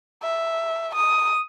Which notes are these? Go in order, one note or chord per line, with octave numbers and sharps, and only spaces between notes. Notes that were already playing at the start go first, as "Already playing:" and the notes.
E5
D#6